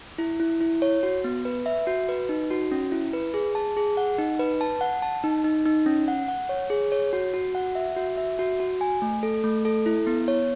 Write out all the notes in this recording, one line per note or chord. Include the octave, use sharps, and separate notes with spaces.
E4
E4
E4
C#5
F#4
B3
B4
E5
F#4
B4
D#4
F#4
C#4
E4
B4
G#4
A5
G#4
F#5
D#4
B4
A5
F#5
A5
D#4
D#4
D#4
C#4
F#5
F#5
C#5
G#4
C#5
F#4
F#4
F#5
E5
F#4
E5
F#4
F#4
G#5
A3
A4
A3
A4
E4
B3
C#5